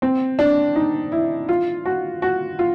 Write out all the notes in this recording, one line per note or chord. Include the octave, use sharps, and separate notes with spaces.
C4
D4
D#4
E4
F4
F#4
F#4
F4